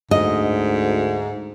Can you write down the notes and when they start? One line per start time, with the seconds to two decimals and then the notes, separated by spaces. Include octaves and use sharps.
0.11 D2 G#2 D#5